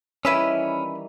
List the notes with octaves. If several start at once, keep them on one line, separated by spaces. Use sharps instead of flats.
D#3 E3 G3 C#4 E4 B4 E6